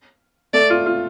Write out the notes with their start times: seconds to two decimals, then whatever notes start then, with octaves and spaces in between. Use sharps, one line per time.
0.54 A3 D5
0.70 F4
0.86 F4